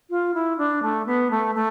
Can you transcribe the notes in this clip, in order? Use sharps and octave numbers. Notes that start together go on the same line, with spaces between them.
F4
E4
D4
A3
B3
A3
A3